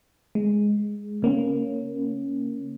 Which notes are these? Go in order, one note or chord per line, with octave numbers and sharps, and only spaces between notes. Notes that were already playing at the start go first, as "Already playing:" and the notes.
G#3
C#3 A#3 C#4